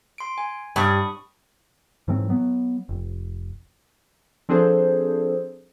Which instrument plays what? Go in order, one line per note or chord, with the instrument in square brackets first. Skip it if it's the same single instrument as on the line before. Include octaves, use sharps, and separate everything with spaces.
[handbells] C6 D7
G#5
[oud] G2 [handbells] B5 C#6 D#6
[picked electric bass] G#2 E3 F#3 C4
F#3 B3
F1
[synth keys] F3 C4 D4 G#4 A4 C5